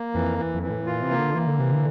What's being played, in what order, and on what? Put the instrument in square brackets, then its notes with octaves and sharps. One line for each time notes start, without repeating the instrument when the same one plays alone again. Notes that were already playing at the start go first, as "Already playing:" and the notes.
Already playing: [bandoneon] A#3
[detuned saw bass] F2 [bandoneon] E3
[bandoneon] E3
[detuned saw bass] F2
[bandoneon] E3
[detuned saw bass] A2
[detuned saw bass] A#2 [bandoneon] F4
[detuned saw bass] C3
[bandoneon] A#3
[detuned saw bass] D3
[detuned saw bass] E3 [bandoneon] A#3
[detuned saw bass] D3
[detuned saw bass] C3 [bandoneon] E3
[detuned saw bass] D3